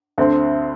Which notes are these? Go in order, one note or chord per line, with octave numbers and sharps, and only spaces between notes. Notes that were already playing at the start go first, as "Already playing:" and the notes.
D2 D3 C4